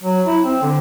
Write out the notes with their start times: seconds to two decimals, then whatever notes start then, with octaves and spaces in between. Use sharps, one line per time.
0.03 F#3
0.27 E4
0.44 C4
0.63 D3